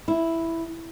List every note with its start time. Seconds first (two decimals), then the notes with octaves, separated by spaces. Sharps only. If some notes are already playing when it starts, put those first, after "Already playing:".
0.08 E4